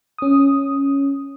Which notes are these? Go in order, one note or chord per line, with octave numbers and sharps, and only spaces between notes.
C#4 D#6